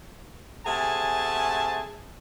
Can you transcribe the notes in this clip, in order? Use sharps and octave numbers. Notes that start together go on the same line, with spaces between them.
C3 A3 G#4 F#5 G#5 A5